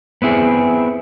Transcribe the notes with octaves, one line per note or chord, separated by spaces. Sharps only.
B3 C4 E4 G#4